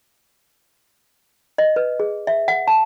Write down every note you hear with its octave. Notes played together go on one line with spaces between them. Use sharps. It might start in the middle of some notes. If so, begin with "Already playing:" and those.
D#5
B4
G#4
E5
F#5
A5